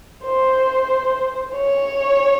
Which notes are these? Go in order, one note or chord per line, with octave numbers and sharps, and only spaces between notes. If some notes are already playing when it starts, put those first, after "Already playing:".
C5
C#5